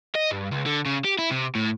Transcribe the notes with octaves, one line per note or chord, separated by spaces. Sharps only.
D#5
G2
C#2
D3
C#3
G4
E4
C3
A2